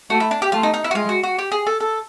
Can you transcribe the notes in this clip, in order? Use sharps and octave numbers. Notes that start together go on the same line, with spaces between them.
A3 F#4
E4
D4
G4
A3 F4
D#4
D#4
E4
F#4
G#3 F4
F#4
F#4
G4
G#4
A4
A4